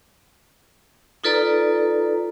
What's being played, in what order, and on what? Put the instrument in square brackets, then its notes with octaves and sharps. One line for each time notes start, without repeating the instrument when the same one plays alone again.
[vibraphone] D#4 F4 A4 B4 D5 A#5